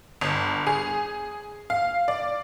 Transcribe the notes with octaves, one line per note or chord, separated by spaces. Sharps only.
G1
G#4
F5
D5